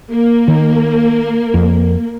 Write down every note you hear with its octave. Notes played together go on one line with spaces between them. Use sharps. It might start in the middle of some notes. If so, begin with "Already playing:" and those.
A#3
D#3
F2